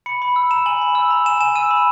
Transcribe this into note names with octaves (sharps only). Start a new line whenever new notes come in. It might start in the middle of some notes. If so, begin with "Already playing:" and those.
B5 C#7
B5
E6
A#5 E7
G#5 F#7
B5
E6
A#5
G#5 E7
G#5 E7
E6 D#7
B5